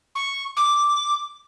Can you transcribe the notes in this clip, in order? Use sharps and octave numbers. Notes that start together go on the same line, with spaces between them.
C#6
D6